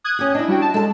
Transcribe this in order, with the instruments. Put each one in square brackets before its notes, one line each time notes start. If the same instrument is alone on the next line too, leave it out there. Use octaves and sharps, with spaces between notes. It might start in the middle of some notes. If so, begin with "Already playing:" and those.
[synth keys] D#6 F#6 G#6
[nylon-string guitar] C#4 G4
[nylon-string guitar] D4 E4 [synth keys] D#5
[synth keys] G3 F#4 G5
A5
[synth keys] G#3 [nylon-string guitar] A4 A5